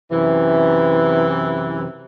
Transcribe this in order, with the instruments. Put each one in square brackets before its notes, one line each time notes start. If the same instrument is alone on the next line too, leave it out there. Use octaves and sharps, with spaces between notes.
[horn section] F#2 C3 E3